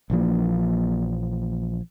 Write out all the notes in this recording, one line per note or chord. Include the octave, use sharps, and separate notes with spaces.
A#1 E3 F3 A#3